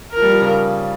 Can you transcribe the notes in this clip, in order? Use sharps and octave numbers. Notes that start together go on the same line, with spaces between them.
A#4
F3
G3
F3
C#3